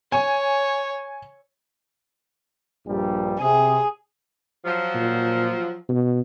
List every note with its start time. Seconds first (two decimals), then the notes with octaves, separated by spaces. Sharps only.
0.12 C#5 G#5
2.86 A#1 G2 G3
3.40 C3 G#4
4.65 F3 F#3
4.95 A#2
5.89 B2